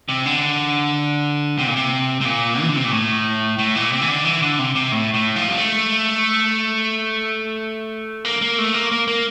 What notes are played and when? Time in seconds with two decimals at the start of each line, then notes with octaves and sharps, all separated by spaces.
0.09 C3
0.26 D3
1.59 C3
1.67 A#2
1.76 C3
2.21 C3
2.25 A#2
2.61 E3
2.68 D3
2.76 C3
2.85 A#2
2.91 A2
3.59 A2
3.76 A#2
3.92 C3
4.02 E3
4.08 D3
4.25 E3
4.42 D3
4.59 C3
4.75 C3
4.92 A2
5.14 A2
5.36 F3
5.48 G3
5.58 A3
8.25 A#3
8.42 A#3
8.58 A3
8.74 A#3
8.92 A#3
9.08 A#3